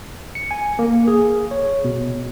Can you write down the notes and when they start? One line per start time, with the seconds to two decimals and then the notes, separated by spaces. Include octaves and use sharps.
0.35 C#7
0.51 G#5
0.79 A#3
1.07 G#4
1.51 C#5
1.84 B2